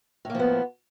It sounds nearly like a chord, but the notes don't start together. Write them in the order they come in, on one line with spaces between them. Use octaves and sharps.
A2 A#3 F3 B3